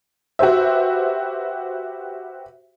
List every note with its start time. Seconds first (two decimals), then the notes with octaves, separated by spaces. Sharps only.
0.39 F#4 G4 B4 C5 E5